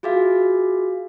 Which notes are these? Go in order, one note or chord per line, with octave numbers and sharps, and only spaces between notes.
F4 F#4 G#4 E5 F5